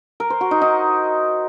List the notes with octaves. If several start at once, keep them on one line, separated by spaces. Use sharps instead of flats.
A#4
C5
F#4
D#4
D#4